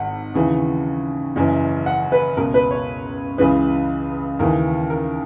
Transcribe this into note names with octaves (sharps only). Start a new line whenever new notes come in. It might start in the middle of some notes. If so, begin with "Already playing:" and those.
Already playing: G#1 G#2 F#5
D#2 C#3 E3
F#1 F#2 E3
F#5
B4
C#2 B2 A#4
B4
C#5
C#2 C#3 E3 B4
D#2 C#3 E3 A#4
A#4